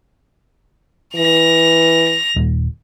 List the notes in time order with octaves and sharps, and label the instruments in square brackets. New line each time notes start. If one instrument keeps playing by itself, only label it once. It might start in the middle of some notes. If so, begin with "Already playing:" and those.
[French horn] E3 [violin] A#6 F7
[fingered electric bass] D#1